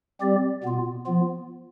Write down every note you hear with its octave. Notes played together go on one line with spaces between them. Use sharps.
G3 C4 G4 D5
B2 B3 F4
F3 B3 F4